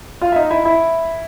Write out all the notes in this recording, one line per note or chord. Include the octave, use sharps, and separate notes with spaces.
F4 F5
E5
D#4 D#5
E4 E5
E4 E5